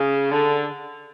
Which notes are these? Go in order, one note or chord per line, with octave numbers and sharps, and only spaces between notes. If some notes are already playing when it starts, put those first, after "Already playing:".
Already playing: C#3
D3